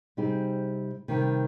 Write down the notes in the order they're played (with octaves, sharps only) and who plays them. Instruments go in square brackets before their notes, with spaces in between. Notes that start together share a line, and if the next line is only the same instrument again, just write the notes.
[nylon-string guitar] C3 G3 C4 D#4 G#4
C3 D#3 G3